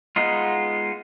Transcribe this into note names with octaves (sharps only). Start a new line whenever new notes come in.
G#3 B3 D#4 F4